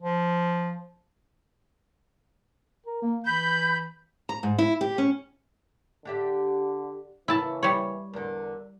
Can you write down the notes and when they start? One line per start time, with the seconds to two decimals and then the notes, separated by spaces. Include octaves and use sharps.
0.01 F3
2.86 A#4
3.02 A#3
3.24 E3 B5 G6
4.29 A#5
4.43 G#2
4.58 E4
4.81 G4
4.98 C#4
6.05 D3 D4 G4 E5
7.28 C#3 E3 A#3 E4 A5
7.63 G3 C#5
8.13 E2 D3 A#4